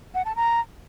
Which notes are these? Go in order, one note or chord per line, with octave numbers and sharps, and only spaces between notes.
F#5
A5
A#5